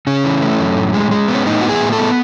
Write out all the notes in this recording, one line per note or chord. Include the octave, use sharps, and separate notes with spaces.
C#3 C#4
E3
A3
F#2
A2
G#3
G#3
B3
C#4
A2 D#4
B3 F#4
G#4
A2
A4
B3